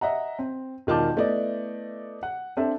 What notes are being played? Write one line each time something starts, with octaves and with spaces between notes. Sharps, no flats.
D#5 E5 F#5 A#5
C4
E1 D#3 F4 A5 D6 G6
A3 B3 E4 D5 D#5
F#5
C4 D4 A4 E5 A5